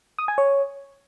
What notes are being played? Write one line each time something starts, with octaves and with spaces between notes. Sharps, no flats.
D#6
G#5
C#5